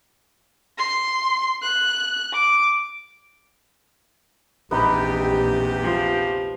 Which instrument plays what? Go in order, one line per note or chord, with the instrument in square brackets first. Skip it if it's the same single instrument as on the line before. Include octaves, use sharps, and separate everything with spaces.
[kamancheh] C6
F#6
D6
[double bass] A#1 E3 [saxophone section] E2 C3 G4 [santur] B3 D#4 B4
[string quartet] F3